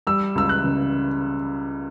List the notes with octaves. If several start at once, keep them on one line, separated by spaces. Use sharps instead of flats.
G3 E6
C#2 E6
F#6
C#3